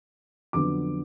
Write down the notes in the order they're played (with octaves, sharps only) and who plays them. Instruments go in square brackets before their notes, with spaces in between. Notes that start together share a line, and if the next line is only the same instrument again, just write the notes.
[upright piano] F2 D3 F#3 B3 D6